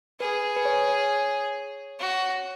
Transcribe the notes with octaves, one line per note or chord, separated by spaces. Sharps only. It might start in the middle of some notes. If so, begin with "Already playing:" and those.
G#4 B4
B4
C#5
F#4